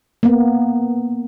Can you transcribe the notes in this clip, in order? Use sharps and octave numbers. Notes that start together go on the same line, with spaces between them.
A#3 B3